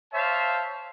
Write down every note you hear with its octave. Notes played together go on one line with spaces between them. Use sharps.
C5 C#5 E5 F5 A5